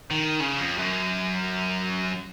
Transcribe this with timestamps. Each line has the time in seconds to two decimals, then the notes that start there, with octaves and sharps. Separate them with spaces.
0.11 D#3
0.40 C#3
0.59 F2
0.78 F#2